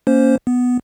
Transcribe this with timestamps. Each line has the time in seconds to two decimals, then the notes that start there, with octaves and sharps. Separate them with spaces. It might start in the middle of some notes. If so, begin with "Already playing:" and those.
0.07 A#3 C#4 C5
0.47 B3